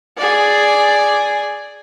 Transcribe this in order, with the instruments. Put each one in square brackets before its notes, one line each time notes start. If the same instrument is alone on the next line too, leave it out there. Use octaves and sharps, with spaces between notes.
[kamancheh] G#4 D5